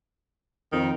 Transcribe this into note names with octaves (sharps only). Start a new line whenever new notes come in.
F2 D#3